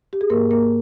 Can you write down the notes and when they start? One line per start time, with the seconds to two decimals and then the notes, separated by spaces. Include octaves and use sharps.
0.13 G4
0.21 G#4
0.30 G#2 A#3 A#4
0.51 A#3 A#4